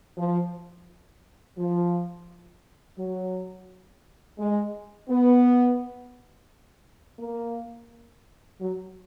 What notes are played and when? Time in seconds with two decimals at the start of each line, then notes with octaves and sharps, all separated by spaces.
0.17 F3
1.57 F3
2.98 F#3
4.38 G#3
5.09 B3
7.19 A#3
8.60 F#3